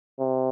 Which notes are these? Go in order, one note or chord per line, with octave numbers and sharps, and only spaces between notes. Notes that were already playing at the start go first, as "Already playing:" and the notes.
C3